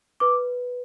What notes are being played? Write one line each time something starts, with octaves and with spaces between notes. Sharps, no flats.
B4 D6